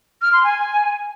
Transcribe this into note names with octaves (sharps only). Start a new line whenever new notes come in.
F6
C6
G#5